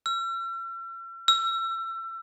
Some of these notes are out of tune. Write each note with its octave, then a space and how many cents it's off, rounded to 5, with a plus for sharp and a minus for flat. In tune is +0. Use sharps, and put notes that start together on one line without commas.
E6 +45
E6 +30